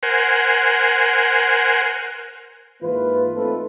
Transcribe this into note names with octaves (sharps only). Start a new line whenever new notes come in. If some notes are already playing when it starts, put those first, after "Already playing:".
A#4 C5 F#5 G#5
G#2 E3 A#3 F4 B4
A3 C4 D#4 F4 A4 B4